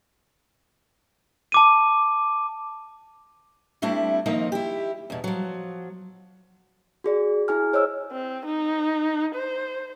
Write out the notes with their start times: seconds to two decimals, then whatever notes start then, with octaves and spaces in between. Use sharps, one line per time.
1.52 A5 D6 D#7
3.82 G3 A3 C4 D4 E4
4.26 D#3 F3 A#3 C4 D#4
4.52 E4 G4
5.10 E2 B2
5.24 F3 F#3
7.04 F#4 G#4 D5
7.48 E4 G#4 G#5 F6
7.73 C5 C#5 D#5 E6
8.12 C4
8.46 D#4
9.35 C5